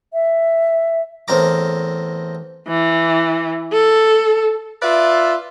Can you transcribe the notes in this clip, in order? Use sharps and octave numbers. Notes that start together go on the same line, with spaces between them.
E5
E2 A2 C4 A#4 A#5 D6
E3
A4
F4 B4 D5 E5